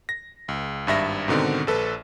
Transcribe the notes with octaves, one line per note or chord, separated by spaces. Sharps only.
A#6
C#2
G#1 G2 E5 A#6
G#2 B2 D3 D#3 C4
A#1 A4 B4